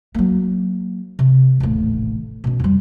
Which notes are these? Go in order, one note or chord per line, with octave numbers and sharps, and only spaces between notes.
F#3 A#3
C3
D#1 A1
B2 C#4
F2 G3